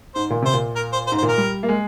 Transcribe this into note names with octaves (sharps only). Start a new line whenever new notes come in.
G#2 C5
A#2
C3 C5
A#2
A#4
C5
C5
G#2
C5
A#2
A#4
G3
A#3
G#3